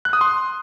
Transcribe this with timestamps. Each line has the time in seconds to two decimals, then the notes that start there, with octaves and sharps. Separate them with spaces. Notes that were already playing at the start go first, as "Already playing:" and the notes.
0.05 F#6
0.13 D#6
0.21 C6